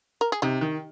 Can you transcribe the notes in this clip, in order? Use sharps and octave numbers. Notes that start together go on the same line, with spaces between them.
A#4
G#4
C3 D#4 G4
D#3